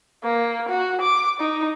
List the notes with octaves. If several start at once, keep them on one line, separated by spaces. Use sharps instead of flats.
A#3
F#4
D6
D#4